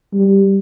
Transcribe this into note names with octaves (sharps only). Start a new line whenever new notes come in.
G3